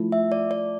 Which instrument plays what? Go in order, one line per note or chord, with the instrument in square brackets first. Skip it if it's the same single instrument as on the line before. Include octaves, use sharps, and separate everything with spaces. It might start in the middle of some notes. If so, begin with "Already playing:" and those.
Already playing: [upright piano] F3 A3 E4
[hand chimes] E5
D5
D5